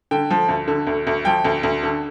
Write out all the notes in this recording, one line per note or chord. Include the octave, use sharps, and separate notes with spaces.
D3 G5
F3
D2
D3
D2
D2
F3 G5
D2
D2
D3